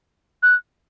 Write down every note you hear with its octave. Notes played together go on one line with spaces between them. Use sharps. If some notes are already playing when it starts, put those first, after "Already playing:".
F#6